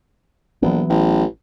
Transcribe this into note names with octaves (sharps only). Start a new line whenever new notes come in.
A#1 E3 F#3 B3
A1